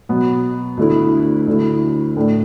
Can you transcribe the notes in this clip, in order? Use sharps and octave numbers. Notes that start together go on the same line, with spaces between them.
B2 F#3 B3
D2 D3 A3 E4
D2 D3 A3 E4
A2 A3 D4